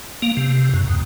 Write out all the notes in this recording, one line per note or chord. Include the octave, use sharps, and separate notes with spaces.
A#3
C3
F#2
D#2